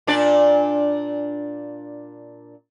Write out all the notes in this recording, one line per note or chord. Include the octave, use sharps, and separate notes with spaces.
A#2 D4 D5